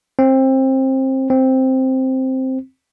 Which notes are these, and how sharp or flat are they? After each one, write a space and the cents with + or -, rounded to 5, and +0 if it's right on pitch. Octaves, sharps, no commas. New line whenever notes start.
C4 +20
C4 +0